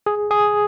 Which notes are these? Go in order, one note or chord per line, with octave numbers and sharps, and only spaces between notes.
G#4
G#4